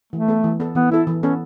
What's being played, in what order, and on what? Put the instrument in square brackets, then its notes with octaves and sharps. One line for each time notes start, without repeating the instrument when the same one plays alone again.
[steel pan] E3 [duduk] A3
[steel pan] B3 A4
E3
B3 A4
[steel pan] E3 [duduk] B3
[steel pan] B3 A4 [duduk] E4
[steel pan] E3
[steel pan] B3 A4 [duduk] C#4